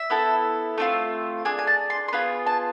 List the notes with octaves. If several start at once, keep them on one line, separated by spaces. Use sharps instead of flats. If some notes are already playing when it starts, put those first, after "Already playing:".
Already playing: E5
B3 E4 A4
A3 C4 F4
D4 G#4 G#5
G#5
A5
C6
C6
B3 F4 G#4 B5
A5